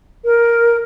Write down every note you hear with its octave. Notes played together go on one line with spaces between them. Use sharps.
A#4